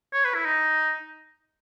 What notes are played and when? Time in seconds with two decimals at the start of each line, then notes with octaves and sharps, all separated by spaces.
0.13 C#5
0.24 B4
0.35 E4
0.45 D#4